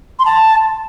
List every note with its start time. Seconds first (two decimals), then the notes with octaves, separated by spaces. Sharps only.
0.19 C6
0.25 A5